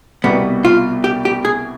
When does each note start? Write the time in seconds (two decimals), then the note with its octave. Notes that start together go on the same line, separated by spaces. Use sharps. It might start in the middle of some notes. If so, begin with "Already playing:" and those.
0.24 C2 B2 G3 B3
0.65 F4
1.04 G4
1.25 G4
1.45 G#4